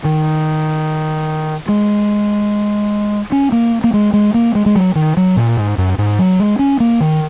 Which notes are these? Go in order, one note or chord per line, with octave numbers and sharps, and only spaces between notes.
D#3
G#3
C#4
A#3
A#3
G#3
G#3
A#3
G#3
G#3
F#3
D#3
F#3
A#2
G#2
F#2
G#2
F#3
G#3
C#4
A#3
D#3